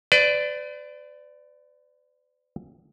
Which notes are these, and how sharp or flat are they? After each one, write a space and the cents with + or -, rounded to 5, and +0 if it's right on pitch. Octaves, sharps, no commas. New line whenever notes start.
B4 +45 D5 +0